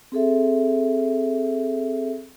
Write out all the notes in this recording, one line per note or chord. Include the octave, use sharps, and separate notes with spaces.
C4 G#4 A4 E5